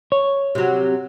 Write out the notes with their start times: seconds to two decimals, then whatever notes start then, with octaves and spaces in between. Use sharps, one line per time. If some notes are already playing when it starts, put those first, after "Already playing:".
0.12 C#5
0.55 C3 F#3